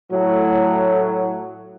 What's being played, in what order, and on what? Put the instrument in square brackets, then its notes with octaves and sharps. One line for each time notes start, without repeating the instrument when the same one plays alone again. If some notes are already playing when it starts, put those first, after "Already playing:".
[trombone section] A2 F#3